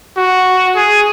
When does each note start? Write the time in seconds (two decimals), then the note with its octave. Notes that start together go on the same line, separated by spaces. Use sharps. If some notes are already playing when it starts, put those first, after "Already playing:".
0.17 F#4
0.75 G#4